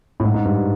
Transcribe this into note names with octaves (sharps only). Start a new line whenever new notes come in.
A2
G#2
G#2
G2